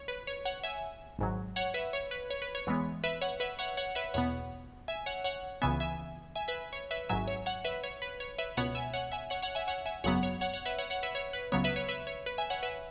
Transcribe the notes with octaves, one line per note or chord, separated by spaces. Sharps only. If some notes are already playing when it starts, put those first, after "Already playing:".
Already playing: C#5
B4
C#5
C#5 F#5
E5 G#5
G#1 G#2 F#3
C#5 F#5
B4 E5
C#5
B4
C#5
B4
C#5
E2 E3 G#3 B3
B4 E5
C#5 F#5
B4 E5
C#5 F#5
C#5 F#5
B4 E5
E2 B2 B3 C#5 F#5
E5 G#5
C#5 F#5
C#5 F#5
C#2 C#3 E3 B3 E5 G#5
E5 G#5
E5 G#5
B4 E5
C#5
B4 E5
G#1 G#2 F#3 E5 G#5
C#5
C#5 F#5
B4 E5
C#5
B4
C#5
B4 E5
C#2 B2 B3 C#5 F#5
E5 G#5
C#5 F#5
E5 G#5
C#5 F#5
C#5 F#5
E5 G#5
C#5 F#5
E5 G#5
G#1 F#2 C#3 F#3 B3 C#5 F#5
C#5
C#5 F#5
C#5 F#5
B4 E5
C#5 F#5
C#5 F#5
B4 E5
C#5
B4
C#2 C#3 F#3 B3 C#5
B4 E5
C#5
B4 E5
C#5
B4
E5 G#5
C#5 F#5
B4 E5